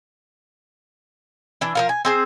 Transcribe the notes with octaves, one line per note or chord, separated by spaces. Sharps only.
E3 D4
F3 A#4 F5
G#5
C4 G#4 C5